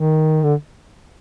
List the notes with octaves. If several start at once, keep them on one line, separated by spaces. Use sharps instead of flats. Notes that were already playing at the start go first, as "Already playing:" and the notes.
Already playing: D#3
D3